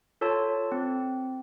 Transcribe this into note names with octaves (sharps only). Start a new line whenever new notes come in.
F4 A4 C#5 A5
C4